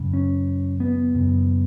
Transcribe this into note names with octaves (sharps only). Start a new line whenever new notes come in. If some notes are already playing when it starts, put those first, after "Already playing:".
Already playing: F#2 C#3
C#4
B3
F#2 C#3